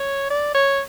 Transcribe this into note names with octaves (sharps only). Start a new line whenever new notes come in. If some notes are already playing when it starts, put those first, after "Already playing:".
Already playing: C#5
D5
C#5